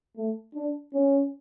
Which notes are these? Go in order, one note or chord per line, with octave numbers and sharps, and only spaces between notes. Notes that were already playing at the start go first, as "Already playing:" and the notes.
A3
D4
C#4